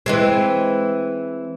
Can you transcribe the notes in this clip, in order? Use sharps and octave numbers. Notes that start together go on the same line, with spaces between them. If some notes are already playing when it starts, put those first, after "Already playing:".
E3 G#3 C4